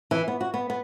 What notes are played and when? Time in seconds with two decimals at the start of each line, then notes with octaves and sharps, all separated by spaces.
0.11 E3
0.28 B3
0.41 F#4
0.54 B3
0.70 B3